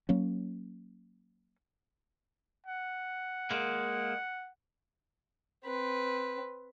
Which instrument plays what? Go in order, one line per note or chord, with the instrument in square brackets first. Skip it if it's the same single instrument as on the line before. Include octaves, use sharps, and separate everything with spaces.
[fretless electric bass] F#3 A#3 C#4
[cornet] F#5
[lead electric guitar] G#3 A#3
[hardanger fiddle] C4 B4